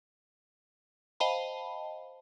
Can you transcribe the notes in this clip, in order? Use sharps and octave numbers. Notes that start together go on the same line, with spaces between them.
C5 D#5 F5 G5 A5 B5